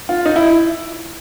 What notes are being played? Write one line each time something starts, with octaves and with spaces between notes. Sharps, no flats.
F4
D#4
E4